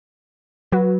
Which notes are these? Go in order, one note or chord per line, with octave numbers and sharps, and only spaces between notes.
F#3 F#4 B4